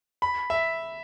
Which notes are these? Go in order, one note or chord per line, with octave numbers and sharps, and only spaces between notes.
B5
E5